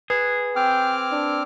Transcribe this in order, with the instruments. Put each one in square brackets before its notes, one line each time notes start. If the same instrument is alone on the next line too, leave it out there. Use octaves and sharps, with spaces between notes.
[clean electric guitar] G#4 [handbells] B4
[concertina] C4 D6 F6 [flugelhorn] G5
[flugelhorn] D4